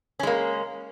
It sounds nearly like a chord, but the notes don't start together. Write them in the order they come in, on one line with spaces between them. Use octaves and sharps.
C#4 G#3 A#3